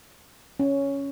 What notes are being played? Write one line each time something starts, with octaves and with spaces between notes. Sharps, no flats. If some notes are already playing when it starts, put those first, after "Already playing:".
C#4